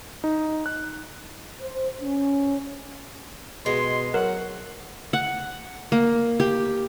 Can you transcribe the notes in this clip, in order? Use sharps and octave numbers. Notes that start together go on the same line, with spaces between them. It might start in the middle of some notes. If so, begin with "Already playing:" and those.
D#4
F#6
C5
C#4
B2 G#3 C6
F#3 A#4 F#5
F#5
A#3
G4